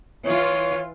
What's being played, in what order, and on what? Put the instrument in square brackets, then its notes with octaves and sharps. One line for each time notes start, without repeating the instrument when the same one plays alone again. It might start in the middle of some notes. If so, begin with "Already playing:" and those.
[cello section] E3 F4 [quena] C#5